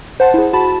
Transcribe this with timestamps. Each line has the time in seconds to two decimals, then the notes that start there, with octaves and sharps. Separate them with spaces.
0.20 C5 F#5 A5
0.34 E4 G#4
0.53 F#4 A5 B5